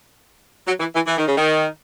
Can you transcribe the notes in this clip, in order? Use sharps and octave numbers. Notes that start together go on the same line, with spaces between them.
F#3
E3
E3
E3
D#3
C#3
D#3